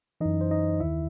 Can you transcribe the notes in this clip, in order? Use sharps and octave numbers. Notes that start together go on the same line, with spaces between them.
F#2 E3 D#4 D#5
C5
D#4 D#5
D#2 D#3 E4 E5